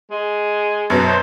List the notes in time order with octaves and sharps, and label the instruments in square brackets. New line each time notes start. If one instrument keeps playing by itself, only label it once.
[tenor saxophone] G#3
[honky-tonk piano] F#2 B2 F#3
[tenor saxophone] C5